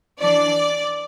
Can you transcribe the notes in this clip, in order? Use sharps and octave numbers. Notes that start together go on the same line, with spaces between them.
E3 D4 D5